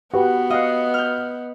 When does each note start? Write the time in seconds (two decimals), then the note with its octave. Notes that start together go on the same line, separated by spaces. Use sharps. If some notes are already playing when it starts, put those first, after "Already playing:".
0.14 B3 F#4 G4 B4
0.50 D#5 F5 F#5
0.94 F6 G6